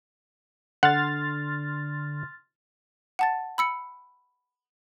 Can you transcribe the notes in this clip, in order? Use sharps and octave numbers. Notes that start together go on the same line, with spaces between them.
D3 F#5 C6 F6 A6
F#5 A5 A6
B5 E6 C#7